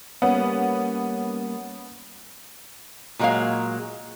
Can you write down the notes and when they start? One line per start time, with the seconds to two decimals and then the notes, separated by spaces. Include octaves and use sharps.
0.22 G3 A#3 B3 C#4
3.19 A#2 F#3 G#3 A#3 C#5 F5